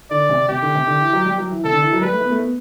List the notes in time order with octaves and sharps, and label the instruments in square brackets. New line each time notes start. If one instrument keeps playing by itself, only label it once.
[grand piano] D3 [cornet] D5
[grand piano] C3
[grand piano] C3 [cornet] G4
[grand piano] D3
C3
D3
E3
F#3
G3
F#3
E3
[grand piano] C3 [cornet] A4
[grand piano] D3
E3
F#3
[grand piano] G3 [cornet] B4
[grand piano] A3
B3
A3
B3